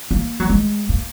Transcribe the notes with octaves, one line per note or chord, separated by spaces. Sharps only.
A#3
F#3
G#3
A#3